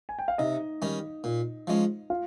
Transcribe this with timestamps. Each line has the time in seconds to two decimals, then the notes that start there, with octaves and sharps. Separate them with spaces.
0.09 G#5
0.19 G5
0.28 F5
0.38 C3 D#4 D#5
0.82 D#3 G3 C#4
1.24 A#2
1.67 F3 G#3 C#4
2.10 F4 F5